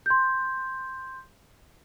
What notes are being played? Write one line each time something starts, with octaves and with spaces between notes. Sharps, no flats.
C6 G6